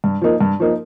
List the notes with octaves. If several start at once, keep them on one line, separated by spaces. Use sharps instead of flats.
G2
F3 A#3 D#4
G2
F3 A#3 D#4